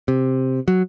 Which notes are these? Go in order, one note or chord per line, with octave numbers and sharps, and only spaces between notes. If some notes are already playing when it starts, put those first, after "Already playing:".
C3
F#3